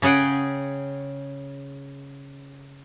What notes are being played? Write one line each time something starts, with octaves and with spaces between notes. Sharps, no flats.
C#3 C#4 G#4 F#5 G5